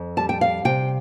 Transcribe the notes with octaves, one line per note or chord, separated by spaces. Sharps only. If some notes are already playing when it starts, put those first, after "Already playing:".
Already playing: F2
G3 A5
G5
F5
C3 G5